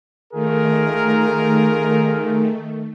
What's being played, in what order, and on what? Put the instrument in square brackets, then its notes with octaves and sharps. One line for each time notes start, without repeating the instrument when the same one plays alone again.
[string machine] D#3 A3 [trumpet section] F4 G#4 A#4